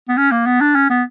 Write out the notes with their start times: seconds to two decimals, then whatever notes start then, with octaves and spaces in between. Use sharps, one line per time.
0.09 B3
0.17 C#4
0.31 A#3
0.46 B3
0.61 D4
0.75 C#4
0.90 B3